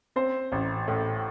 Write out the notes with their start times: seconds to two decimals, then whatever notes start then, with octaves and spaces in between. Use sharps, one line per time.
0.16 C4 C5
0.52 A1
0.88 A2